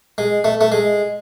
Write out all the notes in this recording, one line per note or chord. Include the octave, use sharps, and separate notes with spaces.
G#3
A3
A3
G#3